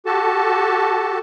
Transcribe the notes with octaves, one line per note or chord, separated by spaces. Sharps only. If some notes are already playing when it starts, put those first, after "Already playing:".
F#4 G4 A4 A5